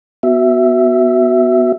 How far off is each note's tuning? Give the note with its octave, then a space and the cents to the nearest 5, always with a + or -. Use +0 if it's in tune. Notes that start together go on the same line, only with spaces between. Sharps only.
B3 +0 F#4 +0 E5 +0